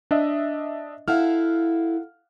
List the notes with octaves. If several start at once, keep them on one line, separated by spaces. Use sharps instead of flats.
D4 D#5 E5
E4 A4 F5 F#5 F6